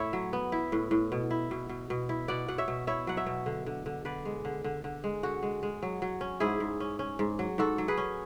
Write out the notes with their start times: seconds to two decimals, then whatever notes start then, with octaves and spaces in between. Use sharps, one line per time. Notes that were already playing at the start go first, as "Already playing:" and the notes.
Already playing: A2 E4 C#5 E5
0.13 F#3
0.33 B3
0.52 E4
0.72 A2
0.91 A2
1.12 B2
1.30 E4
1.51 B2
1.69 B2
1.90 B2
2.09 E4
2.28 B2 D5 F#5
2.48 B2 F#5
2.58 C#5 E5
2.68 B2
2.87 E4 C#5 E5
3.07 F#3 F#5
3.17 C#5 E5
3.26 B2
3.46 D3
3.66 D3
3.86 D3
4.05 D3 B4 D5
4.25 G#3
4.45 D3
4.64 D3
4.84 D3
5.04 G#3
5.23 D3 F#4
5.43 G#3
5.63 G#3
5.83 F#3
6.02 F#3
6.21 C#4
6.40 G#2 E4 G#4
6.60 G#2
6.80 C#4
6.99 C#4
7.19 G#2
7.39 F#3
7.58 G#2 F#4 A4
7.78 F#3
7.88 G#4 B4
7.97 C#4